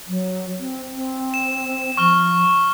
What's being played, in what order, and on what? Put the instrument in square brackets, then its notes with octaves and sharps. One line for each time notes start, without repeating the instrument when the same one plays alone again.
[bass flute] F#3
C4
C4
[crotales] E7
[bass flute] F3 [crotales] C#6 F6 G7